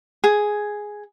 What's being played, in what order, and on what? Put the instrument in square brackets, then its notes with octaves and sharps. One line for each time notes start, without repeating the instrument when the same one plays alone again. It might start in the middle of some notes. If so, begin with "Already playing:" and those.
[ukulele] G#4